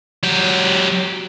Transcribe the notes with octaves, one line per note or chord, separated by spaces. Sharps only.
F#3 G4